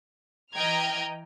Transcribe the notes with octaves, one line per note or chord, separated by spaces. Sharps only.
E3 D#5 G5 A#5 F6 G#6